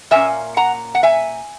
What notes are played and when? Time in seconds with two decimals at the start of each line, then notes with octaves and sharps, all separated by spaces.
0.11 A#2 A#3 C#4 E5 G#5
0.57 F#5 A#5
0.95 F#5
1.03 E5 G#5